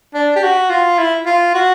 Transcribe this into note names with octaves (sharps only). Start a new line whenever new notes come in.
D4
G4
F#4
F4
E4
F4
F#4